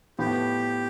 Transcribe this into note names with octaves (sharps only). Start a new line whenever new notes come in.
A2 F3 B3 G4